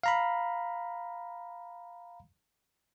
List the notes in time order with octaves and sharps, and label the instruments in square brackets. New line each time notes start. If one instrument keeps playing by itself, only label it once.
[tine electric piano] F5 A#5 B5